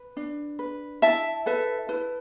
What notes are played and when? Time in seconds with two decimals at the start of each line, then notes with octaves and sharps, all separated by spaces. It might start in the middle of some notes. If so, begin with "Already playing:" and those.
Already playing: B4
0.17 D4
0.59 B4
1.02 E4 E5 A5
1.46 A4 B4 E5
1.89 E4 B4